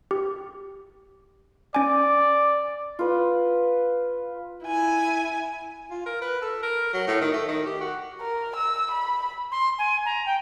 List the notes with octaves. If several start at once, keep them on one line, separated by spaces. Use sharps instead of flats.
G4
C#4 D5 G#5
F4 B4
E4 G#5
F4
A#4
B4
A4
A#4
F#3
A2
D#3
A3
D#3
G4
F#4
A#4
E6
B5
C6
G#5
A#5
G5